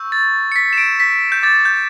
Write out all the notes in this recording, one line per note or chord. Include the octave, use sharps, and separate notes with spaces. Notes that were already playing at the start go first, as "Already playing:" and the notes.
Already playing: C#6 E6 G6
A6
C#7
B6
E7
D7
B6
G6
D6 G6 A6
G6